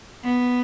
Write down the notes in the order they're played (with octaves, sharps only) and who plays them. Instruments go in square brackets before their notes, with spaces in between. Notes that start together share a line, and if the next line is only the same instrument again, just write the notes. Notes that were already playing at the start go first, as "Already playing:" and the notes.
[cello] B3